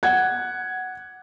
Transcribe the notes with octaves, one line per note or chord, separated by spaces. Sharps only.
F#5 G#6